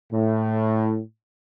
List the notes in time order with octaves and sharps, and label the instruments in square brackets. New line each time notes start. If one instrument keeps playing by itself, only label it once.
[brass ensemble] A2